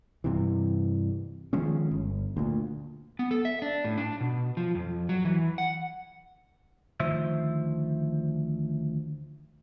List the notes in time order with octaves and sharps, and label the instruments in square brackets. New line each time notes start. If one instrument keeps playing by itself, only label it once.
[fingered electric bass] G2 C3 E3
D#3 F3 G#3 C#4
G1
D2 A#2
[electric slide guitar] B3
A4
E5
D4
A2
D4
B2
F3
F2
F#3
E3
F#5
[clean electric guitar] D2 D#3 F3 C5 E5